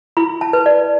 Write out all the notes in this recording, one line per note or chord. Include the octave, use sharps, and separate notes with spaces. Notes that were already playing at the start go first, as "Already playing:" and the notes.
E4 B5
A5
B4
D5